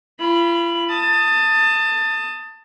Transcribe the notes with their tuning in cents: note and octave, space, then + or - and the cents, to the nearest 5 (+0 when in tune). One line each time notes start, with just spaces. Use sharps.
F4 -40 B5 +0
A5 +25 D#6 +0